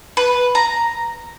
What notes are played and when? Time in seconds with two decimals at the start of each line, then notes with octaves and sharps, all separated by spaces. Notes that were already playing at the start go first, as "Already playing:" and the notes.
0.17 B4
0.55 A#5